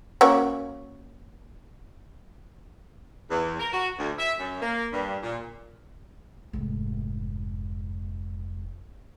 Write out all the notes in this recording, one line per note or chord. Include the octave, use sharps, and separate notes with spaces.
A#3 C#4 F#4
E2
A#4
F#4
D2
E5
F#2
A#3
G2
A#2
F1 G#2